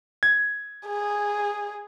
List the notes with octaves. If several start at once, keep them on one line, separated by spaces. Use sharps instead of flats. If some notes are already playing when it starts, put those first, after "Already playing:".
G#6
G#4